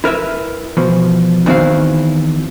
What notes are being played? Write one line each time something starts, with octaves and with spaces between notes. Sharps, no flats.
E4 A#4 B4 E5
B2 E3 F3
E2 D#3 C4 E4 F#4 F5